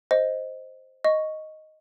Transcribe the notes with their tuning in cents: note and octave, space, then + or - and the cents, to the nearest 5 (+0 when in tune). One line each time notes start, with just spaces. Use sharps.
C5 +0 D#5 +0
D#5 +0 C#6 +0